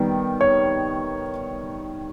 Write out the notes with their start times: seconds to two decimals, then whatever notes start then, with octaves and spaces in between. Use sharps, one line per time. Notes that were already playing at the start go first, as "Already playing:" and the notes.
Already playing: D#3 G3 B3
0.41 C#5